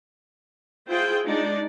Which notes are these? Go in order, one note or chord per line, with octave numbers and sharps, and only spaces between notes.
E4 F4 G#4 C5 G5
G#3 D4 D#4 D5